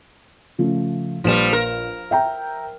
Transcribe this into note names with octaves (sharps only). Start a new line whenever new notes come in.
C#3 F3 A3
A#1 F3 G3 B4 E7
A#4
E5 G5 A#5